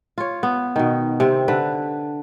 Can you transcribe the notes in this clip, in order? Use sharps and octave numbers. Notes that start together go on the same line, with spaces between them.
F4 C#5
B3
B2 D#3
C3 C4
D3 B4